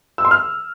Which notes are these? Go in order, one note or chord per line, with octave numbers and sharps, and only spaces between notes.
E6
C6
F6